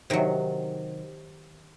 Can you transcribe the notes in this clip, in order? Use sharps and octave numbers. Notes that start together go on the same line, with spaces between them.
C3 D#3 F#3